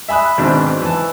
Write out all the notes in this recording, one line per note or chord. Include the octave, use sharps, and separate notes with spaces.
E5 G#5 B5 D#6 F#6
G#2 B2 D#3 C4 D4
E3 A5